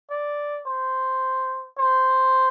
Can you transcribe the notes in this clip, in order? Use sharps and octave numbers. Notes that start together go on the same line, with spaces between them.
D5
C5
C5